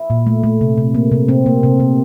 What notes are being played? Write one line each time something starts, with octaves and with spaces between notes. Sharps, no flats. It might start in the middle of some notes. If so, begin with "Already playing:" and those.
Already playing: E4
A#2
A3
A3
C3
C3
A#3
C3
C3 C4
A#3
C3
C3